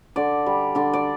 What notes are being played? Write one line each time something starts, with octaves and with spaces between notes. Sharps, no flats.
D3 D5
G3
D3 D5
D5